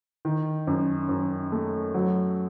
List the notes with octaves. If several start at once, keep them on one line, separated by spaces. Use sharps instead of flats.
D#3
F#2
F#2
A3
F#3